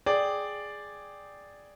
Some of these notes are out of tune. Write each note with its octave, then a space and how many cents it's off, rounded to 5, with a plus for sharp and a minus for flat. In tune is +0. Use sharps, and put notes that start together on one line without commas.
G#4 +0 D5 +0 G5 +0